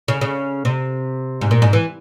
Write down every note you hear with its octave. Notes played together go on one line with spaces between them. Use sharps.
C#3
C#3
C3
G#2
A#2
G#2
E3